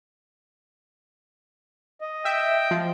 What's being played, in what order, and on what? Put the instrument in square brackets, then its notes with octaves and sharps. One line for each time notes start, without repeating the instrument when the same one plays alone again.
[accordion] D#5
[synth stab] E5 [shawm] G5
[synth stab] F3